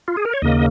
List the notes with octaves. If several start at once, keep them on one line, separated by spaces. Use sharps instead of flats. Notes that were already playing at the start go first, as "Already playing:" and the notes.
F4
G#4
A#4
C#5
D#2 C#3 A#3 D#5